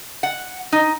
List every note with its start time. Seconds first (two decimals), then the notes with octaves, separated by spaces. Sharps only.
0.23 F#5
0.72 D#4